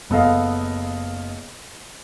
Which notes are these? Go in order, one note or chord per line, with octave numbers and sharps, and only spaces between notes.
F#1 B3 A4 D#5 F5